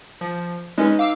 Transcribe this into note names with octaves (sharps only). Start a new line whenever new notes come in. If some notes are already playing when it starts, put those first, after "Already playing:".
F3
G#3 C#4 D#4 B4
F5 D6 E6